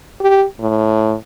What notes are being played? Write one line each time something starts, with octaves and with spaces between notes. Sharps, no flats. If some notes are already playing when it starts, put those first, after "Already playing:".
G4
A2